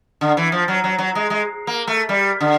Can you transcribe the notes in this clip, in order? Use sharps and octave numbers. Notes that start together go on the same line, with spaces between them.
D3
E3
F3
F#3
F#3
F#3
G#3
G#3
A#3
A3
G3
D3